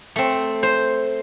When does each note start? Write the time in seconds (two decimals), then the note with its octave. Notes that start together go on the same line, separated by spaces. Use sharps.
0.16 A3 C4
0.63 C5